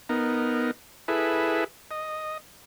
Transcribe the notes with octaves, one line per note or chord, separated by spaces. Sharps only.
B3 D#4 A#4
E4 G#4 A4 B4 E5
D#5